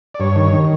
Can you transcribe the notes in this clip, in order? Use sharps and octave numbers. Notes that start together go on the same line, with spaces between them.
D5
G2 C#5
D#3
D#3